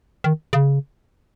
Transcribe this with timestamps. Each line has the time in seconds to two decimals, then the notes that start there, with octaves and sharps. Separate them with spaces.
0.24 D#3
0.53 C#3